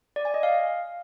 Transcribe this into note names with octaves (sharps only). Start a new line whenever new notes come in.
D5
G#5
D#5
F5